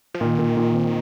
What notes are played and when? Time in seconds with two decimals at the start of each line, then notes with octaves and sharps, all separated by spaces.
0.14 F3
0.21 A#2 D#3
0.39 A#2
0.57 A#2
0.75 C4